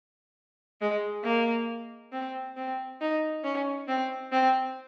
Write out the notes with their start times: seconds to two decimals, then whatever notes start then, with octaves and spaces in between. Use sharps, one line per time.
0.81 G#3
1.24 A#3
2.12 C4
2.57 C4
3.01 D#4
3.44 C#4
3.88 C4
4.32 C4